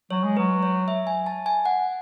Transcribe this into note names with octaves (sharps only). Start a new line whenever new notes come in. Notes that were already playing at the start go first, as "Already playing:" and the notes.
F#3 C#5
G#3
F#3 B4
C#5
E5
G#5
A5
G#5
F#5